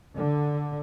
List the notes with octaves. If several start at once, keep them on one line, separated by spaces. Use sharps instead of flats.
D3